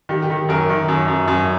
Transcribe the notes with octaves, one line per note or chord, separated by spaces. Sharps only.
D#3 G4
G4
D#3
F#2 A#4
D#3
F#2
F#2
F#2